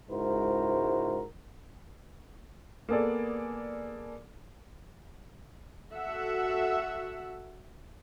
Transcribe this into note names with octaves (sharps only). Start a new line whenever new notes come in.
C#2 G#2 E4 F#4 A#4 C5
A#3 B3 G#4 A4 D5
F#4 A4 E5 F#5